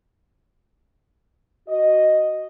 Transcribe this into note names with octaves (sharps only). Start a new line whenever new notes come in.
F#4 D#5